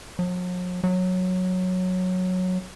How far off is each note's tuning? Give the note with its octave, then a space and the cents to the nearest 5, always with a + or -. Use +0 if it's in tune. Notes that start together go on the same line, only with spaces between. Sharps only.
F#3 -45
F#3 -10